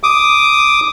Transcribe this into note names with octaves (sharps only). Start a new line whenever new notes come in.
D6 D#6